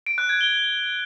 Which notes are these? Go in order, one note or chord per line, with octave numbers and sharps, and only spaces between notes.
D7
F#6
G#6
G7